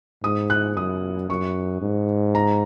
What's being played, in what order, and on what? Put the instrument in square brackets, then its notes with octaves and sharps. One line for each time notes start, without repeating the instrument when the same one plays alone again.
[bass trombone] G#2 [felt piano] D#6
[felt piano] F#6
[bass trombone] F#2 [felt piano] D#6
[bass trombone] F#2 [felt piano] C#6
[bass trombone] G#2
[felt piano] A#5